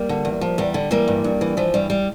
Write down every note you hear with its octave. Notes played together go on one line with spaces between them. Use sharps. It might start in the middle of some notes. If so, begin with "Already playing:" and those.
Already playing: G3 A#3
D3
E2
F3
E2 G3
D3
E3 G3 A#3
G2
G2
E3
E3 F3
G2 G3
G3